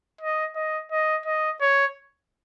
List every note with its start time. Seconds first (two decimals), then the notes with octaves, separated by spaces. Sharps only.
0.21 D#5
0.56 D#5
0.92 D#5
1.26 D#5
1.61 C#5